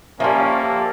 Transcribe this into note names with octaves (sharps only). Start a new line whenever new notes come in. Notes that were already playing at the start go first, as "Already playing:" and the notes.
F3 G3 A#3 C#4 E5 A5 C6
G4 A4